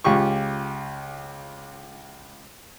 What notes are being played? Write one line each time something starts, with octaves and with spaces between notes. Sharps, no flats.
C#2 F4 G4 C#6